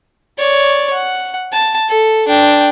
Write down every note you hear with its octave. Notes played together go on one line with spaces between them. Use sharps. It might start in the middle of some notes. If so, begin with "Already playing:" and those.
C#5 D5
F#5
A5
A4
D4 G5